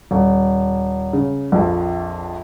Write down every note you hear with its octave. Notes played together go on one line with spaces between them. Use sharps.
D#1
C#3
A#1 F2